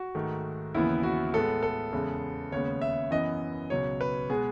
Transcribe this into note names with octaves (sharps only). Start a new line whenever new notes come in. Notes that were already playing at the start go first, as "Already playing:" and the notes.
Already playing: F#4
G#2 D#3 A3
D#2 C#3 E3 B3 E4
F#4
A2 G#3 B3 A4
A4
E2 C#3 G#3 B3
D#2 C#3 G#3 B3 C#5
E5
F#2 E3 B3 D#5
C#2 B2 F#3 C#5
B4
B2 G#3 B3 G#4